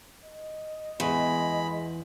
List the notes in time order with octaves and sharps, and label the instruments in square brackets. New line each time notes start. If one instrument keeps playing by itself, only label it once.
[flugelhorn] D#5
[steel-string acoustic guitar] E2 [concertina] G#3 B5